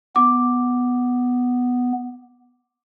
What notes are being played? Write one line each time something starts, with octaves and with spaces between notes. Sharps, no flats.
B3 D6